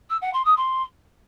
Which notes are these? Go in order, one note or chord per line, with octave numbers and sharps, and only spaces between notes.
E6
F#5
C6
D#6
C6